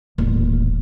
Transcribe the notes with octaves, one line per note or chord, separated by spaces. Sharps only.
D#1 A1